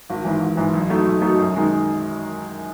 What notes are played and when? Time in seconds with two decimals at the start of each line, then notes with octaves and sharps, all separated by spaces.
0.10 G#1
0.24 G#2 E3
0.42 G#1
0.57 G#2 E3
0.73 B1
0.89 B2 A3 D#4
1.05 B1
1.21 B2 A3 D#4
1.38 F#2
1.54 D#3 G#3 D#4